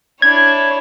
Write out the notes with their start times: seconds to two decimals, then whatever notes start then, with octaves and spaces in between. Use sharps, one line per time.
0.22 D4 E4 C#5 G#6